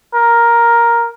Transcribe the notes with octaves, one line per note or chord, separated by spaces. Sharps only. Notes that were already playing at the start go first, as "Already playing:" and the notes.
A#4